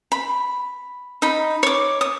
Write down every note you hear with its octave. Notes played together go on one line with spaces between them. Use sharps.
B5
D#4 B5
C#5 D6
D#6